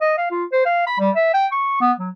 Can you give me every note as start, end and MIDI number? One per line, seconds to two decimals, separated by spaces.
0.01 0.14 75
0.18 0.29 77
0.31 0.44 65
0.52 0.65 72
0.66 0.84 77
0.87 0.99 83
0.99 1.10 55
1.15 1.30 76
1.34 1.47 79
1.52 1.80 85
1.81 1.92 59
1.99 2.10 54